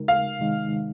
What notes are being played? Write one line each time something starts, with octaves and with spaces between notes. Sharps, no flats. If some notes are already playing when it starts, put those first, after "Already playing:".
Already playing: C#3 G#3 D#4 F#4 A#4
F5
C3 D#3 G#3 D#4